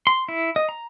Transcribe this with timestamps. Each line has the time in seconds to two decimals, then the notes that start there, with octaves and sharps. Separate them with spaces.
0.07 C6
0.29 E4
0.56 D#5
0.69 A#5